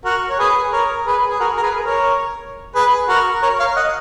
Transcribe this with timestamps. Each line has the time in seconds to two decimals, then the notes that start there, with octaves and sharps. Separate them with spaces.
0.05 F#4 A#4
0.29 C#5
0.39 G#4 B4
0.72 A#4 C#5
1.07 G#4 B4
1.30 G#4
1.40 F#4 A#4
1.57 A#4
1.62 G#4 B4
1.85 A#4 C#5
2.75 G#4 B4
3.08 F#4 A#4
3.42 A#4 C#5
3.60 C#5 F5
3.76 D#5 F#5